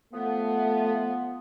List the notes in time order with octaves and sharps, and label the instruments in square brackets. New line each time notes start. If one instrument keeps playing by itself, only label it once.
[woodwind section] F3 B3 [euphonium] A3